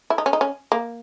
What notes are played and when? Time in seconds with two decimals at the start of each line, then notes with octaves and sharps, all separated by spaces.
0.10 E4
0.18 D#4
0.26 C#4
0.33 D#4
0.41 C#4
0.72 A#3